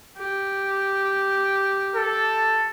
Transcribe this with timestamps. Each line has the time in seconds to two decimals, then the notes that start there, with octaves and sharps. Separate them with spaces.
0.17 G4
1.95 A4